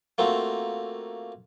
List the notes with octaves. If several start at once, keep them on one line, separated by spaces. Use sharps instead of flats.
A3 A#3 C4 F4 F#4